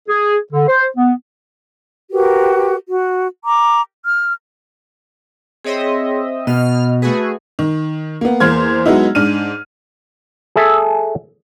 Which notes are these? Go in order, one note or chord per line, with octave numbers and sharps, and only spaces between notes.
G#4
D3
C5
B3
F#4 G4 A#4 B4
F#4
A#5 D6
F6
C4 G#4 C#5 D#5 E5 C6
B2 D#5 F6
A3 F#4 G#4 B4 B5
D#3
A#3 B3
E2 A#3 C5 F6 G#6
F#3 G#3 B3 D#4 E4
G#2 D4 F6 D#7
G#4 A4 E5